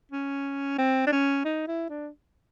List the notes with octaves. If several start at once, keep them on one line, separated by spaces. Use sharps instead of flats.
C#4
C4
D4
C#4
D#4
E4
D4